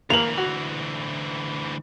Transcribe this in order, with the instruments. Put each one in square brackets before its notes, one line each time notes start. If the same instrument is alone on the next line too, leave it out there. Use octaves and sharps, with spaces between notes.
[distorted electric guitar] D2 E3 [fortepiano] A#3 A#4 [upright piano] F7 F#7
[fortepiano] F#4